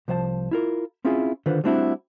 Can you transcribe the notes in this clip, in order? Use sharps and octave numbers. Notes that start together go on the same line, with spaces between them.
C2 F3 C5 E5 A5
E4 F4 A#4
C4 C#4 E4 F4 G#4
D3 D#3 F4 B4 C5
G3 A3 C4 D4 E4 F#4